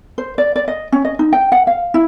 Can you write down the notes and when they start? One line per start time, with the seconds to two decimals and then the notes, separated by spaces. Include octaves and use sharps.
0.18 C5
0.38 D5
0.56 D5
0.68 D#5
0.92 C#4
1.05 D#5
1.19 D#4
1.33 G5
1.52 F#5
1.67 F5
1.94 E4